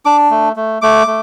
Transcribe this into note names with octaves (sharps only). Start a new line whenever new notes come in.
D4 D6
A3
A3
A3 D6
A3